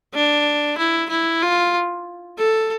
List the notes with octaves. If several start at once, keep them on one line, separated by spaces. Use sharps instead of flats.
D4
E4
E4
F4
A4